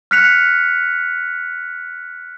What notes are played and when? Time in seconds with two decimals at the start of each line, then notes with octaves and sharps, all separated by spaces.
0.11 F6 F#6 B6 C#7 F7